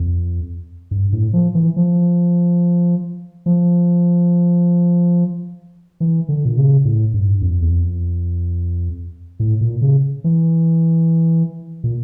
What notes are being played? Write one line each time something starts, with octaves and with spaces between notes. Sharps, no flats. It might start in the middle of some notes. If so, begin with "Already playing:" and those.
Already playing: F2
G2
A2
F3
E3
F3
F3
E3
D3
A#2
C#3
A2
G2
F2
E2
F2
A2
A#2
C#3
E3
A#2